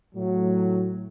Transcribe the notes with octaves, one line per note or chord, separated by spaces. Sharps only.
A2 F#3